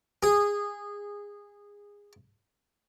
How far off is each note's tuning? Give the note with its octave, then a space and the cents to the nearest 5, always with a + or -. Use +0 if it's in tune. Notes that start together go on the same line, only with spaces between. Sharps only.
G#4 -20